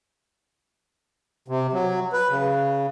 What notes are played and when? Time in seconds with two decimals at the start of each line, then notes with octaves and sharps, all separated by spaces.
1.48 C3
1.73 F#3
2.13 B4
2.30 C#3